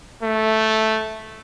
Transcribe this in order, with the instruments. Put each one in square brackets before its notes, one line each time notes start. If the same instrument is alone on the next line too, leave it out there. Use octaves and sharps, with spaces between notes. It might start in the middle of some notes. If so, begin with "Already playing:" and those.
[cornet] A3